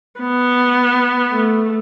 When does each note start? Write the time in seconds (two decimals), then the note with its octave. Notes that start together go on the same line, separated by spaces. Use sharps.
0.21 B3
1.31 A3